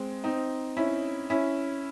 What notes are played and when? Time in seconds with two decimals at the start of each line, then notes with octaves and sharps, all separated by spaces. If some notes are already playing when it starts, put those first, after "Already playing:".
Already playing: G#3 C4
0.24 C4 D#4
0.77 C#4 E4
1.30 C#4 E4